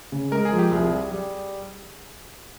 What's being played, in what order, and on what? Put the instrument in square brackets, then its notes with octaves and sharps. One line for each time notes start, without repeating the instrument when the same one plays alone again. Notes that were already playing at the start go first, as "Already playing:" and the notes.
[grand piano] C#3
[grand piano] G#3 [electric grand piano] A#4
[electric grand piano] G#4
[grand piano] F3
[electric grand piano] G4
[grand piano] C2 [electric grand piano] G#4
[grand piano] G3
G3